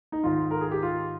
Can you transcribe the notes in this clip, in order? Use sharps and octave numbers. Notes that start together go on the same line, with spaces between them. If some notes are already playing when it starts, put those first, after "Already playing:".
D#4
G#2 D#3 F4
A#4
G#4
G4
F4